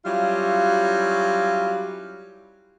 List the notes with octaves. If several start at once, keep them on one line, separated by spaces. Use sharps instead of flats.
F#3 G3 C#4 E4 F4 F5